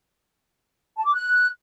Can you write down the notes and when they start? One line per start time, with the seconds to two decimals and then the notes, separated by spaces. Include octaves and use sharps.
0.96 A5
1.05 D6
1.14 F#6